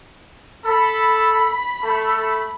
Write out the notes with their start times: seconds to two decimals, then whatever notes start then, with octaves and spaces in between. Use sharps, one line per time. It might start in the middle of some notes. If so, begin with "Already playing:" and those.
0.65 A4 B5
1.83 A3 A4